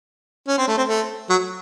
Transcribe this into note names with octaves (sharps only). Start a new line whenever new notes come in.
C#4
C4
A3
C4
A3
F#3